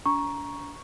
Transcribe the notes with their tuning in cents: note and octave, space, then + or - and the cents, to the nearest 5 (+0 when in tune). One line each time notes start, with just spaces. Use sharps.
D4 -40 A#5 +10 C#6 +0